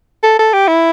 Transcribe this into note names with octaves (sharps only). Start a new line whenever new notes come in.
A4
A4
G4
E4